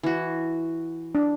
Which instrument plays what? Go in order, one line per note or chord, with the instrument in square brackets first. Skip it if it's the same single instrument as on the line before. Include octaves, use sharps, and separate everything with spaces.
[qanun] E3 F#4
[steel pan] D4